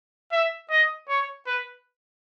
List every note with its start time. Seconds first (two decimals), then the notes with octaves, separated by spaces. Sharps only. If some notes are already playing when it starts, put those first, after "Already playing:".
0.32 E5
0.70 D#5
1.08 C#5
1.46 B4